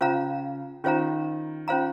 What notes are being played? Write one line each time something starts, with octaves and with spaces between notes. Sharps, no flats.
C#3 C#4 F4 C5 F5 A#5
D#3 C#4 F4 C5 F5 A#5
C#4 F4 C5 F5 A#5